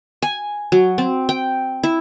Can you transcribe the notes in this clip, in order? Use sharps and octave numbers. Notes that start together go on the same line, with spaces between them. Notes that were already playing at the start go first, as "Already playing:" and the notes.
G#5
F#3
C4
G5
E4